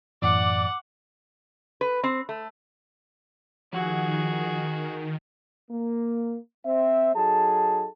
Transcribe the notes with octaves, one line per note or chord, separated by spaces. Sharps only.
F#2 A2 E3 D5 F#5 D6
B4
C4
A3
D#3 F3 F#4 G#4 F#5
A#3
C4 E5
F#3 D#4 G#4 A4 A5